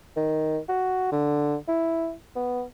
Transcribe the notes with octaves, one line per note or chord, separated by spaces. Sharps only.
D#3
F#4
D3
E4
B3